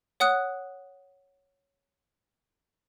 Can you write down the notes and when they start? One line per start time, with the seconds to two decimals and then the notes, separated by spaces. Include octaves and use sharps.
0.20 C#5 F#5 D#6 F#6